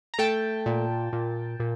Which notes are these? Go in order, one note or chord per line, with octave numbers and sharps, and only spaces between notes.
A#5
A3 G5 A5
A#2
A#2
A#2